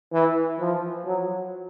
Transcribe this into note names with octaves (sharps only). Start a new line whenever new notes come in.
E3
F3
F#3